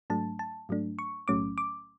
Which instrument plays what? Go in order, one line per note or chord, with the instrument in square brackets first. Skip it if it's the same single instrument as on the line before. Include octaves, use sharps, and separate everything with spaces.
[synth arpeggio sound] G#2 F#3 A3 D4 A5
A5
G#2 F#3 A3 D4
C#6
B1 A2 F#3 A3 C#4 D6
D6